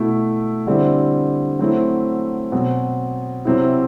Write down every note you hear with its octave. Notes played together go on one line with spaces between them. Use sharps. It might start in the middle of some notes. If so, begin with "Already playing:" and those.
Already playing: B2 A3 E4
D3 G3 C4 E4
F#3 A3 C4 E4
B2 F#3 C4
C3 F#3 C4 E4